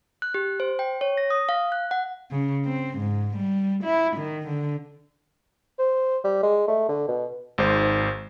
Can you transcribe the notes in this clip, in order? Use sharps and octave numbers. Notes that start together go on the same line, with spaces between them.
F#6
G4
C5
G5
C#5
A#6
D#6
F5
F#6
F#5
C#3
C4
G#2
G3
E4
D#3
D3
C5
G3
G#3
A3
D3
B2
G#1 G#2 C5